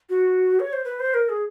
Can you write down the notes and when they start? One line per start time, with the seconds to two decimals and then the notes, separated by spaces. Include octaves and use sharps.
0.09 F#4
0.60 C#5
0.73 C5
0.84 B4
1.00 C5
1.14 A#4
1.29 G#4